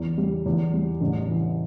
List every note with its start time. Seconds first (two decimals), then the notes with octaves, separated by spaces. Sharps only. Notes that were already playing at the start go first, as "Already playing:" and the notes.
Already playing: E2
0.18 G3
0.46 E2
0.74 G3
1.01 A1
1.28 E3